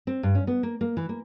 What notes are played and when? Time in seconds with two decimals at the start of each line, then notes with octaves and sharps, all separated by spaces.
0.07 C4
0.23 G2
0.35 C#4
0.47 B3
0.63 A#3
0.81 A#3
0.97 E3
1.09 A#3